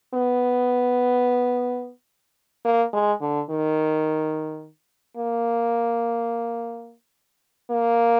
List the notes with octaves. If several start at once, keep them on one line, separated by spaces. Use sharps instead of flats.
B3
A#3
G#3
D3
D#3
A#3
A#3